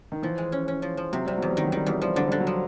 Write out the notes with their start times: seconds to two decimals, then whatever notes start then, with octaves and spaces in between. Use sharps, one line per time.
0.12 D#3
0.23 E3 F3
0.38 G#3
0.52 C#4
0.68 C#4
0.82 F3
0.97 F3
1.12 C3 F#3
1.26 C3 G3
1.38 E2 F#3
1.50 G3
1.57 D#3
1.64 F#3
1.72 D#3 G3
1.86 E2 F#3
2.01 F3 G3
2.15 D3 F#3
2.28 D3 G3
2.40 F#3
2.47 F3